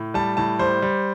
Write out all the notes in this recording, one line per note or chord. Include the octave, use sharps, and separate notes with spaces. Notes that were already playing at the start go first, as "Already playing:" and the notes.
Already playing: A2
G3 A5
A2 A5
G3 C5
G3